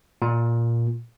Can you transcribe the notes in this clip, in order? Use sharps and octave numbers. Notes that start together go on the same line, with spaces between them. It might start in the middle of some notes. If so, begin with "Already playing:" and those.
A#2